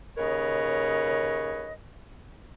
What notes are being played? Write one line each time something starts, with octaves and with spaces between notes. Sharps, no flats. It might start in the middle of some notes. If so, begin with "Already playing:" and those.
D#2 C#3 A#4 B4 C#5 D#5